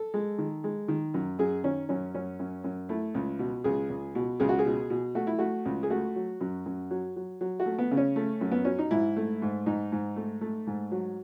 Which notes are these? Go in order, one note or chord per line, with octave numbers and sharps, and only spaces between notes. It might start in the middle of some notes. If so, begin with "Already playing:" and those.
Already playing: A4
G#3
D#3
G#3
D#3
F#2
F#2 G#4
D#3 C#4
F#2 C#4
F#2 C#4
F#2
F#2
A3 E4
C#2
B2
C#2 G#4
C#2
B2
C#2 G#4
F#4
G#4
B2
B2
A3 F#4
E4
A3 F#4
C#2
G#4
A3 F#4
F#3
F#2
F#2
F#3
F#3
F#3
F#4
A3
B3
C#3
C#4
A3
F#2
B3
F#3 C#4
D#4
G#2 E4
A3
G#2
G#2 D#4
G#2
A3
A3
G#2
F#3